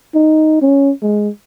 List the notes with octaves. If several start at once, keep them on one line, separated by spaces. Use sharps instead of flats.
D#4
C#4
G#3